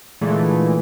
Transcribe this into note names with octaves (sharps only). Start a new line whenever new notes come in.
A#2 D3 E3 G#3 A3